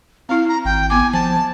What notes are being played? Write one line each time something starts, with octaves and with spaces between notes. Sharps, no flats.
C4 E4 F5
A#5
G#1 G5
B3 G#5 D6
F3 G#5 A5